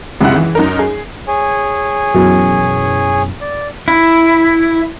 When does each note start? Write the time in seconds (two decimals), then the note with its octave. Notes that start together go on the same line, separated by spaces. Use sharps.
0.21 C#2 F#2 C3 E4 F#5
0.36 E3
0.55 F#2 D#4 A#4
0.79 G#4
1.28 G#4 C#5 G#5
2.15 F#2 B2 E3
3.41 D5
3.88 E4